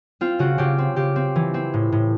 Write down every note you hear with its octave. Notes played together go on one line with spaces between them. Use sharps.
C4 F4
C#3 F#4
C#3 G4
C4
C#3 G4
C4
E3
C4
A2
A2